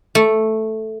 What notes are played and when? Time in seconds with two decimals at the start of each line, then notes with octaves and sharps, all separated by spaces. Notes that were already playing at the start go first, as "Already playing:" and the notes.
0.15 A3